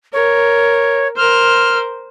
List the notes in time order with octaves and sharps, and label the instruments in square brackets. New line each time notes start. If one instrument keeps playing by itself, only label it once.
[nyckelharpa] A#4 [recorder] C#5
[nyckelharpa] A#4 C5 [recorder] F6